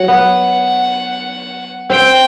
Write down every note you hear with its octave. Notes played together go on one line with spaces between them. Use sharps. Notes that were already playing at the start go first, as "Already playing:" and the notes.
Already playing: F#3 F#5
B3
C4 G5